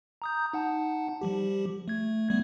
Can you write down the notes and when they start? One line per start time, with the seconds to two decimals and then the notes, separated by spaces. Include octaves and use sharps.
0.22 A#5 D#6 G6
0.53 D#4 F#5 A5
1.21 F3 G3 G4
1.88 A3 G#6
2.30 G3 A3 B3